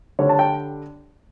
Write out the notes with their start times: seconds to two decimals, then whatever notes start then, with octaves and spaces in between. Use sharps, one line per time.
0.19 D3 G3 D4 C#5
0.29 A5
0.39 G5